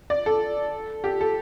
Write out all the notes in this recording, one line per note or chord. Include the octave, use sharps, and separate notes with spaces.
D5
A4
G4
A4